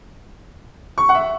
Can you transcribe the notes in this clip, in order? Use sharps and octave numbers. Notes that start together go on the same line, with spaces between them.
C#6
F#5
E5